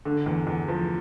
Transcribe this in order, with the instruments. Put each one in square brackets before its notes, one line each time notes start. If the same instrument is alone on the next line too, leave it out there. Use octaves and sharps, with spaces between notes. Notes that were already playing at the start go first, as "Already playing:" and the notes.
[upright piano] D3
E2
E2
F3